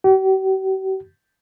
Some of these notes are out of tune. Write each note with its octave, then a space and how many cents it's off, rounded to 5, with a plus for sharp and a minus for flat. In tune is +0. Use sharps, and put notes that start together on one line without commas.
G4 -45